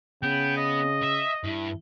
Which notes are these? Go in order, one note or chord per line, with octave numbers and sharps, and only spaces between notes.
C#3 B3 G5
D#5
E5
G2 E4